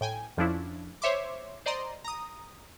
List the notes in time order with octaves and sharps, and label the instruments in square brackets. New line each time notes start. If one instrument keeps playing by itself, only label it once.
[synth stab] A2 G5 G#5
F2 F3 C#4 D4 E4
C5 C#5 E5 C6 D6
C5 D5 D#5 A#5 C6
A#5 D#6